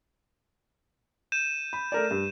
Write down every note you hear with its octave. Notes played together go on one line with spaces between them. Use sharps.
G6 D#7 E7
B5
A3 A#4 D5
G2